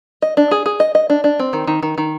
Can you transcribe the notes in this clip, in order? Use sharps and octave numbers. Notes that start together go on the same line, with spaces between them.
D#5
D4
G#4
G#4
D#5
D#5
D4
D4
C4
D#3
D#3
D#3
D#3